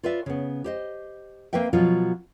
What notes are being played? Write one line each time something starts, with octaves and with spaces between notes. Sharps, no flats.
F4 B4 D5 E5
C#3 B3
G4 C5 D#5
A#3 C4 B4 E5 G5
B2 F3 F#3 F4